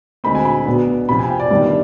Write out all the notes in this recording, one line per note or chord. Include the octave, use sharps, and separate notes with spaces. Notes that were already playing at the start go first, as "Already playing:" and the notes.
D2 D3 G#3 C4 B5
G#5
B5
B1 B2 B3 D4
F2 C3 F3 C4 B5
G#5
G5
D5
G1 G2 D#3 G3 D4